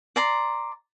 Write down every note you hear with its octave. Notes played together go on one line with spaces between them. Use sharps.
D5 A#5 C6